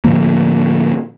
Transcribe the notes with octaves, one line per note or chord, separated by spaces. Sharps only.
A2 D3 F3 A#3